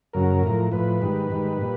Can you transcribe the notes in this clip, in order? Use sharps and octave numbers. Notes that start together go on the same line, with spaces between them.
F#2 C#3 F#3 A#4
A2 F3
A2 F3 B4
G#2 D#3 G3
G#2 D#3 G3
A#2 G3